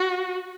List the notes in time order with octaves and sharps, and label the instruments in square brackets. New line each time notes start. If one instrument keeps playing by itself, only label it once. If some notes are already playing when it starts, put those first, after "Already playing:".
Already playing: [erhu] F#4